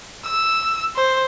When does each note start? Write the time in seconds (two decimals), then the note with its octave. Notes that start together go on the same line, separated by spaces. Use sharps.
0.25 E6
0.96 C5